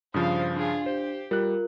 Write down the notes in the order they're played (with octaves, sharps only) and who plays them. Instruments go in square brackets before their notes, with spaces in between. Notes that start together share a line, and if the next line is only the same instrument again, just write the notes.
[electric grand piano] G2 C#3 F3 [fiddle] C5 F5 [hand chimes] D#6
[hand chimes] D4 [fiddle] F4 G#4
[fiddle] G4 [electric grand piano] C5
[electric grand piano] G3 F#6 [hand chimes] F4 A#4